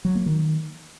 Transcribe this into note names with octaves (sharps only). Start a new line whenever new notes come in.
F#3
A#3
D#3